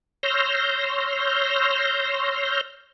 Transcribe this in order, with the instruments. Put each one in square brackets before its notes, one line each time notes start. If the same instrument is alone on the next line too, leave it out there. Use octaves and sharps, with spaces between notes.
[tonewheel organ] C#5 C6 E6 F6 G6 A#6